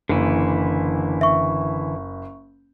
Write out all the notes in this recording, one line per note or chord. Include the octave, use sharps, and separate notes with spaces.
F#1 D3 E3 E4
E5 C#6